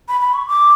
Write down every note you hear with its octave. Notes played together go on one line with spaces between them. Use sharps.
B5
B5
C#6
D6